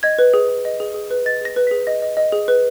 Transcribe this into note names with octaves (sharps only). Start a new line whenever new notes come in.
D#5 G#6
B4
G#4
G#4
D#5
G#4
G#4
B4
D#5 A6
G#4 A#6
B4
G#4 B6
D#5 A#6
D#5
D#5
G#4
B4